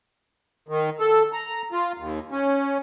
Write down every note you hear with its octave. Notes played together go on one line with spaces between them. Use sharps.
D#3
A4
A#5
F4
D#2
C#4